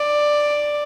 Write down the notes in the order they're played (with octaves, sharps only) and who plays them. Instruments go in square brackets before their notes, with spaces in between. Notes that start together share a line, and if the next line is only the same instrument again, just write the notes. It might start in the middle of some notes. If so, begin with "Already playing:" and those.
Already playing: [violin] D5